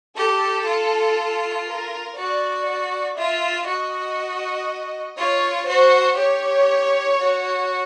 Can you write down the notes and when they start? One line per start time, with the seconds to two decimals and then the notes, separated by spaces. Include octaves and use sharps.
0.17 G4 A4
0.66 F4
1.67 A#4
2.17 F#4 D5
2.67 D5
3.17 F4 E5
3.67 F#4 D#5
5.18 F4 C#5
5.68 F#4 C5
6.17 G4 C#5
7.19 F#4